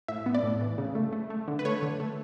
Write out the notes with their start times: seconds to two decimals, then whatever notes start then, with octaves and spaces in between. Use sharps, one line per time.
0.08 A2 E5
0.26 B3
0.35 D5
0.43 A2
0.61 E3
0.78 C#3
0.95 A3
1.13 A3
1.30 A3
1.48 D3
1.59 B4
1.65 A3 C#5
1.82 D3
2.00 A3